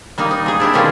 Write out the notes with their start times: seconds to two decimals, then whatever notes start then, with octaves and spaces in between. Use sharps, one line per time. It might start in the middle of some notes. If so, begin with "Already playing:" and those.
0.18 G3 A#3 D#4
0.31 D#4
0.46 G#3 G#4
0.60 D4 E4 G4
0.73 B2 D#3 G3 A#3 C#4 F4